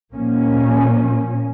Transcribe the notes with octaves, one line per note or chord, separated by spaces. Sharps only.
A#2 F3 A#3 C#4